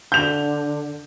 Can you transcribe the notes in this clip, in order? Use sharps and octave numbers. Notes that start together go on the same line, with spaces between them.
D3 G6 F7